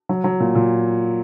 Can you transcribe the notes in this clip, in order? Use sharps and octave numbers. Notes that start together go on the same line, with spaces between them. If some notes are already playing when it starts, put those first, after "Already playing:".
F#3
F#3
A#2
A#2